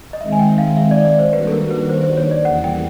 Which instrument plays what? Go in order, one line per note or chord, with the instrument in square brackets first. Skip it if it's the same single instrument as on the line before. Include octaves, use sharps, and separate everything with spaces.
[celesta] D#5
[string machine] D#3 G#3 C4 D#4 [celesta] E5
[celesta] G#5
G5
F5
E5
D5
D5
C5
[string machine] D#3 G3 A#3 D4 F#4 [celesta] B4
[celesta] A4
A#4
B4
C5
C5
C#5
D5
[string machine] E2 C#3 E3 G3 A#3 [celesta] F#5
[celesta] G5